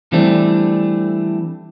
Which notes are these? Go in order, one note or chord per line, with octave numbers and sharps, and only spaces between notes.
E3 G3 A3 C4 D4